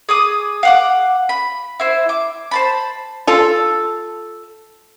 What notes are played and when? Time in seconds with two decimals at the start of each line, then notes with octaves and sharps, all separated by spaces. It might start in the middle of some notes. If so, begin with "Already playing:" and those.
0.09 G#4 D6 D#6
0.63 F5 F#5 D6
1.29 B5
1.80 E4 C5
2.09 D6
2.51 C5 A5 B5
3.27 F4 A4